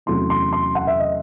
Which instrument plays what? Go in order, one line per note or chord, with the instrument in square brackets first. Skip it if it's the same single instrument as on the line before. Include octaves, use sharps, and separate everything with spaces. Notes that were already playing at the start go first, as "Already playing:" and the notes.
[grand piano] E2 C3 F#3 A3 C#4 C6
C6
C6
F#5
E5
D#5